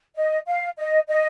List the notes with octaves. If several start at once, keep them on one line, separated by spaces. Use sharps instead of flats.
D#5
F5
D#5
D#5